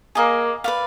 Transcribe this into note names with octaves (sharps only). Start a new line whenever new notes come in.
A#3 G#4 D#5 G#5
B4 D5 F5